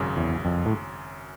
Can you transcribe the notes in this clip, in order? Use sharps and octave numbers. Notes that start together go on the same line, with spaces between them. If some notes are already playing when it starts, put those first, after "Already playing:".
Already playing: G#1 F#2 C#3
E2
F2
A2